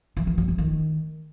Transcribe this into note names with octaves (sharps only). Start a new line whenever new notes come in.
E3
E3
F#3
E3
D#3